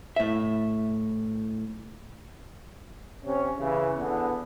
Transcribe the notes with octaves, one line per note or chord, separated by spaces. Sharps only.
A2 E5
C3 C#4
C#3 E3
E2 D3 B3